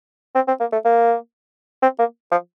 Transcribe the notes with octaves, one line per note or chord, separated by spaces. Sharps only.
C4
C4
A#3
A3
A#3
C4
A#3
F3